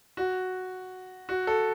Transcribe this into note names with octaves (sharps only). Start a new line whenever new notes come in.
F#4
F#4
A4